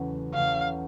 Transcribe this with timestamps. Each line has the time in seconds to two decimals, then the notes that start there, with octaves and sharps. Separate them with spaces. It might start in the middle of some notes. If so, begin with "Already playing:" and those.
Already playing: E2 C#3 F#3 A3 C#4
0.33 E2 C#3 F#3 A3 C#4 F5